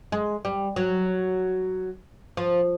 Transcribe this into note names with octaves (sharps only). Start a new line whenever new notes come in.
G#3
G3
F#3
F3